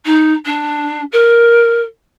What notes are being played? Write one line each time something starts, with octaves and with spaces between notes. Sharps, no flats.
D#4
D4
A#4